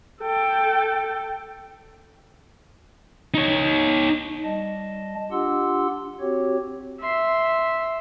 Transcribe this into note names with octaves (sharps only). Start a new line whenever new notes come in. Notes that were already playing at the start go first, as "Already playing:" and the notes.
A4 G5
D#4 C#5
G3 D#5 A5
D4 F4 G4 F#5 C6 E6
C4 F#4 G4 C#5
E5 C6